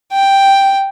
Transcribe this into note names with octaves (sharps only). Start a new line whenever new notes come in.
G5